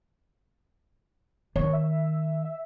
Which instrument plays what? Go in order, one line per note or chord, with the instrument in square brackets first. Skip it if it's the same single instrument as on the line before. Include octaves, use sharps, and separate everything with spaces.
[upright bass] D#3 [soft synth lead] C#5
[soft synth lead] E5
E5